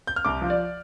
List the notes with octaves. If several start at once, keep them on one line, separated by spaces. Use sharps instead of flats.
G6
F6
C2 D6
F3
D5